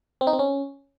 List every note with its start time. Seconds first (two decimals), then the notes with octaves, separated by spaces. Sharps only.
0.21 C4
0.27 D#4
0.33 C4
0.39 C#4